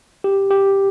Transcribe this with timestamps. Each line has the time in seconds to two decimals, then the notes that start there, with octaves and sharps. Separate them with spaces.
0.24 G4
0.51 G4